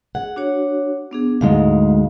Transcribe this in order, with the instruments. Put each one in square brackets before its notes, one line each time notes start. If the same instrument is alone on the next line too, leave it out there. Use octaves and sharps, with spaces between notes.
[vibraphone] G#4 [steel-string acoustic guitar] F#5
[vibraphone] D4 F#4 C#5
B3 D4 G#4
[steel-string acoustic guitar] D2 G#2 G#3 [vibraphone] F5